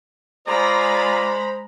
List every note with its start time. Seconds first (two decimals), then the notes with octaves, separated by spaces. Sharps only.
0.48 G#3 F4 G#4 C5 D5 A#5 B5